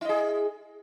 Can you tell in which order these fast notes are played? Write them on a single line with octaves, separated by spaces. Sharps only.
E4 D#5 G#4